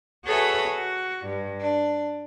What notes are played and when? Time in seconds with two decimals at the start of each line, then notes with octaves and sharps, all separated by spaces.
0.24 F#4 G#4 A4 B4 C#5 E5
0.66 F#4
1.26 G2
1.60 D4